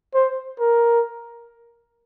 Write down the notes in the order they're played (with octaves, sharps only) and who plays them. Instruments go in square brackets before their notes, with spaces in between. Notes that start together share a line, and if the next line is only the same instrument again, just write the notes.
[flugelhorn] C5
A#4